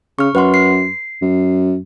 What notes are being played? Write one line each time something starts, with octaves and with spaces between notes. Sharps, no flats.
C#3 C#6 F6
F#2 B4 F#5 C6
C7
F#2